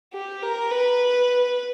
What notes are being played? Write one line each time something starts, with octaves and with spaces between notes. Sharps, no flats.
G4
A#4
B4